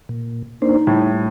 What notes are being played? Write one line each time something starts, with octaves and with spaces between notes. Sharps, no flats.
A#2
A#3 D4 D#4 C5
A2 G3